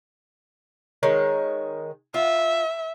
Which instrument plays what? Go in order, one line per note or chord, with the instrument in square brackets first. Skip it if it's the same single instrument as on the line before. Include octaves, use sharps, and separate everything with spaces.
[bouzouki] D#3 G#3 C#5
[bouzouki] F4 [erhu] E5